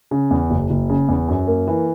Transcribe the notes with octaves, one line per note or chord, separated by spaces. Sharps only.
C#3
E2
F#1
F#1
C#3
E2
F#2
A#3
E3